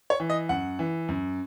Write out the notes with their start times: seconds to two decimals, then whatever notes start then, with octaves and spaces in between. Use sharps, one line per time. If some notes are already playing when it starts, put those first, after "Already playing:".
0.10 C#5
0.20 E3
0.30 D#5
0.49 F#2 F#5
0.79 E3
1.09 F#2